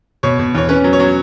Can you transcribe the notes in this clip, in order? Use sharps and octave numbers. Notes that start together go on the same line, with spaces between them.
B2 C#5
B2
E2 C#5
C#4 B4
F#3
C#5
F#3